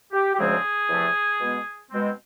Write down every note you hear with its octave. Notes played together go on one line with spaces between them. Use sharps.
G4
G4
D2 C#3 F3 G#3 C4 G#4
E2 C3 F3 A3
B2 G#3 B3
B2 G#3 C4